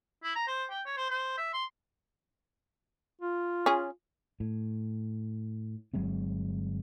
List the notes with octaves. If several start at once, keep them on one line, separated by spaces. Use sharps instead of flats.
E4
A#5
C5
G5
C#5
C5
C5
E5
C6
F4
C#4 G#4
A2
G1 F#3 G#3 C4